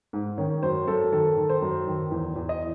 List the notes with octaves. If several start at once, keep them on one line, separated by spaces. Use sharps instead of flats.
G#2
D#3 C#4
F#2 C5
F#2 A4
D#3 A4
D#3
C5
F#2
D#3
E2
E2
D#5